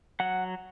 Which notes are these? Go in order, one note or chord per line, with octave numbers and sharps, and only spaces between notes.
F#3 F#5